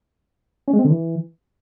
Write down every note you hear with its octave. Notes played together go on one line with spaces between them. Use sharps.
C#4
G#3
C4
D3
E3